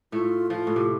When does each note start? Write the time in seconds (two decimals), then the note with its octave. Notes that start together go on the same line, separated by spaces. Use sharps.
0.12 A2 A3 F4
0.50 F3 F4
0.67 A2
0.76 C3